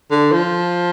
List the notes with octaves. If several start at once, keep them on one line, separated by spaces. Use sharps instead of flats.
D3
F3